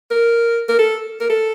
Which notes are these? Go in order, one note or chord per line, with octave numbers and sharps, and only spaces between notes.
A#4
A#4
A4
A#4
A4